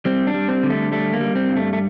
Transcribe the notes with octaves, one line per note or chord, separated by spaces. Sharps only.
G3 C4
D4
G3
C4
D3
A3
G3 A3
A#3
G3
C4
G2
A3
A3